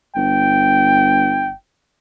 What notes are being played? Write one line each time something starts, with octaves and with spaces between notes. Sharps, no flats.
G1 G5